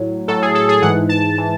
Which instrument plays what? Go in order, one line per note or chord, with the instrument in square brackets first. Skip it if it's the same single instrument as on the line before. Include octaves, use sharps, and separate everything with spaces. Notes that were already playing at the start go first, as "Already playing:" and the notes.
Already playing: [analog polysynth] A2 F#3
A2 F#3 A4
G#4
A4
G#4
G#2 E3 F#5
A5
E3